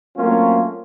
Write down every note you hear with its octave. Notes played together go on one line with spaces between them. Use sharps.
F#3 A3 A#3 C4 C#4 F4